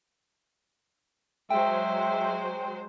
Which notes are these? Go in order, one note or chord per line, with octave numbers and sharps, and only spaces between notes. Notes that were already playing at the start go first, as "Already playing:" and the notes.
F#3 G#3 C5 E5 G5